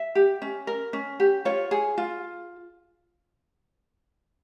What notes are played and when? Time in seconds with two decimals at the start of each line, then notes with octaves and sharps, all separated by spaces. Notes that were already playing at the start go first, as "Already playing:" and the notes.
Already playing: E5
0.15 G4
0.42 C#4
0.67 A#4
0.93 C#4
1.20 G4
1.45 F4 C#5
1.71 G#4
1.98 F4